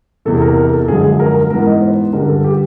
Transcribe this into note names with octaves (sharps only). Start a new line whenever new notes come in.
E2 C3 E3 A4
A#4
A#4
A4
F#2 D3 F3 G#3 G#4
G#4
A#4
A#4
G#2 E3 G#3 B3 A#4
D#5
C5
B4
G2 D3 G3 A#4
A4
G4